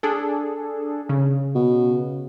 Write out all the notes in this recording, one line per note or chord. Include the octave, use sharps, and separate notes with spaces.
D4 G#4 A4
C#3
B2